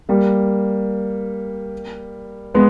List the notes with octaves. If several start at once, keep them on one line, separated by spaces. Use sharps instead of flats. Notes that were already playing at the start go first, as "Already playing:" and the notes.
G3 A#3
G#3 B3